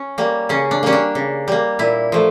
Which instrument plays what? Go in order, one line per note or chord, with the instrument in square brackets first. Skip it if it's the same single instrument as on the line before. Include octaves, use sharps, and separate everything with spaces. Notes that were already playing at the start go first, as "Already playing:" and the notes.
Already playing: [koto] C#4
G3 A#3
C#3 C#4
D4
G3 A#3 C#4
D4
C#3
G3 A#3
A#2 E4
F3 A3